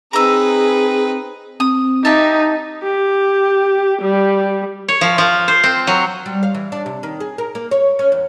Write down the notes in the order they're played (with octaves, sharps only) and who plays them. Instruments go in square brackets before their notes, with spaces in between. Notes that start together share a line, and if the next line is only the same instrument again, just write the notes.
[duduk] C4 [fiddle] D#4 B4 [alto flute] G#4 [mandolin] A#5 E6
[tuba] C4 [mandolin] D#6
[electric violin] D#4 [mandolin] G4 E5 A5
[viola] G4
G3
[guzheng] C#5
F3
F3
C5
C4
F#3
[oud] G3
F5
E3
D4
C3
D#3
G#4
A#4
A#3
C#5
C#4
E2